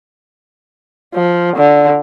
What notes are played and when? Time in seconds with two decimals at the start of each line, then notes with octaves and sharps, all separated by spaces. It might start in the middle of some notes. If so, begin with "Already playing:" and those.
1.15 F3
1.56 D3